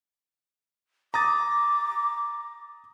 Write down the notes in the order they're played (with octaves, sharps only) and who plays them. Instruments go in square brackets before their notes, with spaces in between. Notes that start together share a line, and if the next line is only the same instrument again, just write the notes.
[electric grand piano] A#5 D#6 A6 [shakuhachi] D6